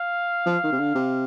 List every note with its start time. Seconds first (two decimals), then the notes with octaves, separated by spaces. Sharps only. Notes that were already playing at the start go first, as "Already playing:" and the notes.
Already playing: F5
0.46 F3
0.63 D#3
0.72 C3
0.80 D3
0.95 C3